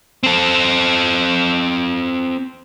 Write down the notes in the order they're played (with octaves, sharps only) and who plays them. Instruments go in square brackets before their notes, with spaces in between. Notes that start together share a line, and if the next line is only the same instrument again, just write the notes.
[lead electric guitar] C4 A4